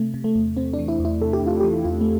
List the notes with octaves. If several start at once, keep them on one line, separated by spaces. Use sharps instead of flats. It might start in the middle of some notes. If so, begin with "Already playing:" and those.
Already playing: C3 A3
C3
A3
E2
C3 C4
D4
E3
E4
E2
E4
C3 A4
G4
E2 F4
E3 G4
E2 F4
A3